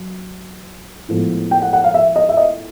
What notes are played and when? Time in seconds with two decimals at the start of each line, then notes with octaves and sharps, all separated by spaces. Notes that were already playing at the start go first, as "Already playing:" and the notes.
Already playing: F#3
1.08 A2 F3 G#3 B3
1.51 G5
1.62 F#5
1.73 F#5
1.84 F5
1.94 E5
2.16 D#5
2.29 E5
2.37 D#5